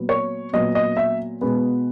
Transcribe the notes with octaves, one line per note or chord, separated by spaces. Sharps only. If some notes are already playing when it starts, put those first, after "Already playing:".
Already playing: A#2 F#3 B3
C#5
A#2 F#3 B3 D#5
D#5
E5
B2 G#3 B3